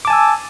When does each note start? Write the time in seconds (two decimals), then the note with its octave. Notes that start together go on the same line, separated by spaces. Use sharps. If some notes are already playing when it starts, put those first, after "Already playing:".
0.05 D6
0.07 A5
0.10 G#5
0.13 E6